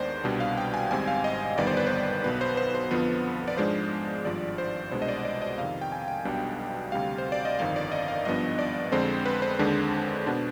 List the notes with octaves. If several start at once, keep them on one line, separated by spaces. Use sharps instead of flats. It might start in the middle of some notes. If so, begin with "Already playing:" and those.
Already playing: D#2 D#3 G#3 B3 D4 C5 D5
C2 B2 G3 D4
F5
G5
G#5
G#1 G#2 G3 C4 G#5
F5
D#5
G1 F2 D#3 G3 B3 D5
C5
B4
C5
B1 B2 B3 B4
C5
C5
C5
F2 D3 F3 B3
D5
G#2 F3 G#3 D4 C5
G#1 G2 F3 D5
C5
C2 B2 G#3 D4 C5
D#5
D5
D5
D#5
F2 C3 D#3 F5
G5
G#5
G5
B1 B2 G3 D4
D2 C3 G3 F5
C5
D5
D#5
G1 F2 D#3 F5
D5
D#5
F5
G#1 G2 F3 B3 D4 D#5
D5
F2 D3 G#3 C4 C5
B4
C5
D#2 D3 G#3 D4
B2 B3 D4